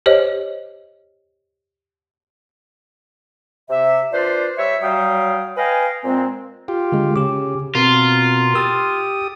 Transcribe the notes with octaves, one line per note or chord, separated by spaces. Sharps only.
G4 C5 C#5 D#5
C3 E5
D4 F4 B4 C5 D5
G3 C#5 E5
F#3 G3 F5 G5 D#6
B4 D#5 F5 G5 G#5
A#2 G#3 C4
F4 G4
D3 G#3
C#3 G4 D6
B2 C4 F4 A#4
G4 D#6 E6 A6